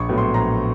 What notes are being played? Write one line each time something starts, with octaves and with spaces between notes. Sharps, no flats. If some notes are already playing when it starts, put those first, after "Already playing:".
Already playing: A#1 C#6
A2 F#3 B3
C6
A#1 A#5